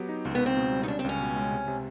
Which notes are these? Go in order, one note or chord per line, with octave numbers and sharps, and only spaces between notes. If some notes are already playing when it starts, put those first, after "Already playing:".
Already playing: F#3 B3 G4
D#4
C#2 C4
B3
C#2
C4
B2
G3
D#4
C#4 D4
C4
C#2 C#4
B2
G#3
C3
C3